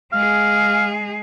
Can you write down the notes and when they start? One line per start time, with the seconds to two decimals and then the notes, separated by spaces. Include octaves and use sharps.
0.13 G#3 G#4 F5